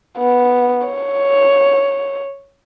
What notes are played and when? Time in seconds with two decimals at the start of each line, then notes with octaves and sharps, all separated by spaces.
0.18 B3
0.87 C#5